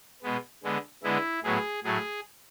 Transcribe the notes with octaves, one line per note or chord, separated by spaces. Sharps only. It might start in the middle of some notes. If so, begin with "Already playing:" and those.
B2 G#3 B3
D3 G#3 B3
D3 G#3 B3 E4
A2 F#3 B3 G#4
A2 F#3 A3 G#4